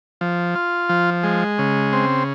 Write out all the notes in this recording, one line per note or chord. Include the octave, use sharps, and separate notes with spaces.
F3
F4
F3
G#3
C#3
C4